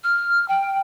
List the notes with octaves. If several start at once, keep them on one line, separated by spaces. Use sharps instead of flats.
F6
G5